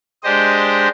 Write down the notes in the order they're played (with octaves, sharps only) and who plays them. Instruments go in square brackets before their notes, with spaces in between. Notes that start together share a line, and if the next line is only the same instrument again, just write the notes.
[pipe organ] G#3 D4 G4 C5 D#5